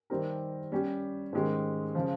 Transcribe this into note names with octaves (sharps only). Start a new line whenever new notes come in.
D#3 G3 C4 G4 A#4
G3 C#4 G4
G#2 D#3 G#3 C#4 G4
C#3 F3